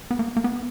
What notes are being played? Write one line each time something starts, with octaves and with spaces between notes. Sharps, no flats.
B3
A#3
A#3
B3